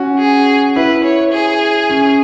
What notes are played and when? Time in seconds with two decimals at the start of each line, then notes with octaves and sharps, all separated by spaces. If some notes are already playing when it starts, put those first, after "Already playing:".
Already playing: C#4 F#4
0.19 G#4
0.76 E4 B4
1.04 C#5
1.33 G#4
1.90 C#4